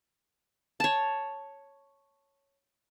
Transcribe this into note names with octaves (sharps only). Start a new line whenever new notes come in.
C#5 A5